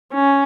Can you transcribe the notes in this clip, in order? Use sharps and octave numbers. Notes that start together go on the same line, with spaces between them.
C#4